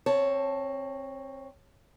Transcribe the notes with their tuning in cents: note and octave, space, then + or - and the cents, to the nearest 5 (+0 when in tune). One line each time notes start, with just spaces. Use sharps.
C4 +25 C#5 +0 A5 +0